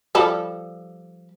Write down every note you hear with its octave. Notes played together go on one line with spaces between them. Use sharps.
F3 G3 A4